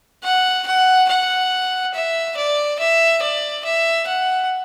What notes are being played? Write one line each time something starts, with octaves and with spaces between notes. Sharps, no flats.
F#5
F#5
F#5
E5
D5
E5
D5
E5
F#5